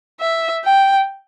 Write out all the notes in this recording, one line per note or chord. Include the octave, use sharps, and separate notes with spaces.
E5
G5